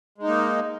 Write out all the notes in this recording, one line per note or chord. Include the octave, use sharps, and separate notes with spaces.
G#3 A#3 D#4